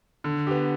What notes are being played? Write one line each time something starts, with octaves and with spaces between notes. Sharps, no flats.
D3
B3 G4